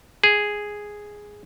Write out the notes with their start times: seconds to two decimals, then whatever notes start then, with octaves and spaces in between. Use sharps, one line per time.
0.24 G#4